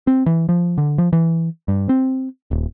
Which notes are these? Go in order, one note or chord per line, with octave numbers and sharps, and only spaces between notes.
C4
E3
F3
D3
F3
E3
G2
C4
D#1